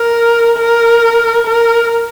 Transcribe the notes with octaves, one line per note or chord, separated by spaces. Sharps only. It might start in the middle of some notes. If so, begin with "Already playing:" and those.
Already playing: A#4
A#4
A#4